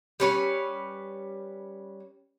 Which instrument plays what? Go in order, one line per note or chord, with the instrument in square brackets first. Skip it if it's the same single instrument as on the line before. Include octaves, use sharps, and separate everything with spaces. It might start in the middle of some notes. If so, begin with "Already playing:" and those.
[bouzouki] G3 C#4 B4